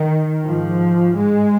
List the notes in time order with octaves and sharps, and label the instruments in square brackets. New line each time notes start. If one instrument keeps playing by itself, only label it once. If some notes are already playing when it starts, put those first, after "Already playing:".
Already playing: [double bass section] D#3
G#2 F3
G#3